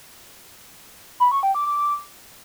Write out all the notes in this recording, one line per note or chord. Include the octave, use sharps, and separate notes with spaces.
B5
C#6
G5
D6
D6